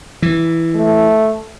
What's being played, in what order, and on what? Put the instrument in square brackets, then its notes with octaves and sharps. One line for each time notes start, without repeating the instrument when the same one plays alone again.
[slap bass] E3
[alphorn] A3